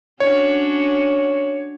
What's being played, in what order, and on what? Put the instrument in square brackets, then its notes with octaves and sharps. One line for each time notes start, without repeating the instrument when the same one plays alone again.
[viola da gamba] C#4 D4 F#4 [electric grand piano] C#5